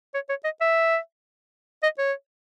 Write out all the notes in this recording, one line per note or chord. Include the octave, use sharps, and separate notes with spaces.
C#5
C#5
D#5
E5
D#5
C#5